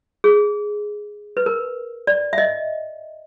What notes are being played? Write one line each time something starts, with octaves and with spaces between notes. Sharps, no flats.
G#4
B4
A#4
D5
E5
D#5